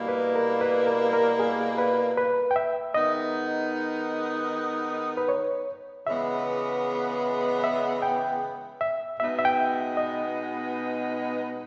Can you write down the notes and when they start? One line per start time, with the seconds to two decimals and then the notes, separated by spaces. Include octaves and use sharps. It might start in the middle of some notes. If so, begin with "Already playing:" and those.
Already playing: B2 G3 A#3 E4
0.08 B4
0.36 A#4
0.61 B4
0.87 A#4
1.13 A#4
1.39 G#4
1.78 B4
2.17 B4
2.51 G5
2.56 E5
2.94 D#3 G#3 B3 D#4 D#5
5.17 B4
5.29 C#5
6.07 C#3 E3 G#3 B3 E5
7.64 E5
8.02 G5
8.81 E5
9.19 B2 G#3 B3 D#4 E5
9.39 E5
9.45 G5
9.97 D#5